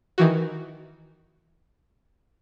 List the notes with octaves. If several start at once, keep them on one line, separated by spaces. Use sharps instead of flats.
D#3 E3 F#4